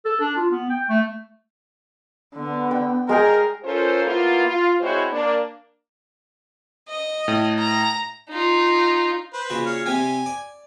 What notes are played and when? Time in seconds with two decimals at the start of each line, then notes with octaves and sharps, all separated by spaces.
0.05 A4
0.20 D4
0.37 F4
0.51 B3
0.70 G5
0.89 A3
2.36 D3 B3
2.71 G5
3.09 G#3 G#4 A#4 G5
3.64 C#4 F4 A4 A#4 C5
4.05 A#3 B3 E4 F4
4.46 F4
4.81 G#3 C4 E4 F#4 C5 C#5
5.11 A#3 D4
6.89 D#5
7.28 A2
7.59 A#5
8.30 D#4 F4
9.33 B4 C5
9.50 A#2 C#3 F#4
9.66 C#5 F5
9.86 C3 G3 C4 G#5
10.26 D5